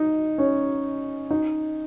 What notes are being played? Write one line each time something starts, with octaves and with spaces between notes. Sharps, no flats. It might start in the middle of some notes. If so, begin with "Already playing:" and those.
Already playing: D#4
C#4
D#4